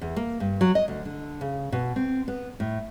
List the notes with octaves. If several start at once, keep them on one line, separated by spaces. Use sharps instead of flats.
E2
A#3
G2
F#3
D#5
D2
D3
C#3
B2
C4
B3
A2